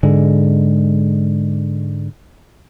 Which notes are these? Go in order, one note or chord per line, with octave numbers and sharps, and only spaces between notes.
G#2 D3 G#3